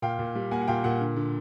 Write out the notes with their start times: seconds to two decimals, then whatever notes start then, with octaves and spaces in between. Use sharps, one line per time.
0.02 A#2 F5 G5
0.19 A#2
0.35 G3
0.51 A#3 F#5 G#5
0.61 F#5
0.67 A#2 F5 G5
0.84 A#2 F#5
1.01 D3
1.16 D3